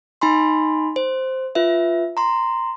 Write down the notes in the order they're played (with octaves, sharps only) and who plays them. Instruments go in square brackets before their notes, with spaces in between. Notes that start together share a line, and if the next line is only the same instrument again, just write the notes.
[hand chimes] D#4 G#5 B5 C6
C5
F4 B4 E5
A#5 C6